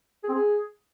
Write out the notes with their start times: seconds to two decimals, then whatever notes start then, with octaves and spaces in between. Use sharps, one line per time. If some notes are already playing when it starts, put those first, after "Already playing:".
0.24 G#4
0.29 C4
0.34 G#4